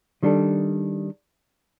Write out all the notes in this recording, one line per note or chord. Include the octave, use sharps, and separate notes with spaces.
D#3 G3 D4 A4